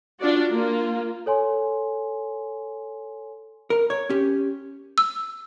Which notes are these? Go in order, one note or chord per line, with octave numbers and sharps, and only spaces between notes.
D4 F4 F#4 D5
A#3 F4
A4 C#5 G#5 C6
A#4
C#5
C#4 G4
E6